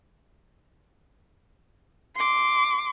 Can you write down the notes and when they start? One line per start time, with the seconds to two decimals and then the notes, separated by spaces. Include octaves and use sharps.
2.16 C6 D6